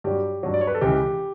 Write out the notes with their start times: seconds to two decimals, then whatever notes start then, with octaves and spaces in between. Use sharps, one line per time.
0.04 G2 F#3 G4
0.43 G2 F#3
0.54 D5
0.61 C#5
0.67 B4
0.75 A4
0.81 C#2 C#3 E3 G4